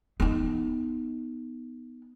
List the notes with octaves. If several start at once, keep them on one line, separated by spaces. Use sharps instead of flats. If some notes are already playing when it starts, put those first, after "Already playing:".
B3 D#4